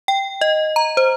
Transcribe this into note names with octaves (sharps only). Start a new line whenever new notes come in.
G5
D#5
A#5
C5